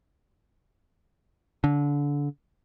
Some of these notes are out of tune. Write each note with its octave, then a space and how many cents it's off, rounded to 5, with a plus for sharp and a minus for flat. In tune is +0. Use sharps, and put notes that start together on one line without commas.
D3 -25